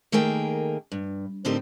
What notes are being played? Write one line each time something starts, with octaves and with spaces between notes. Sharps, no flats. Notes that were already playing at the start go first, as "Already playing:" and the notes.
D#3 A3 A#3 G#4 A#4 G5
G2
A2 D3 C4 D#4 G4 A#4